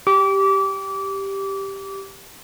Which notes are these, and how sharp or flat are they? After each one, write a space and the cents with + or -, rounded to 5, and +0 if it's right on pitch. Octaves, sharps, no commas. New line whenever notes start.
G4 +0 D6 -25